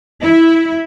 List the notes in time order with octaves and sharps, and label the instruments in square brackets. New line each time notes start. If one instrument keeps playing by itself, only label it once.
[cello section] E4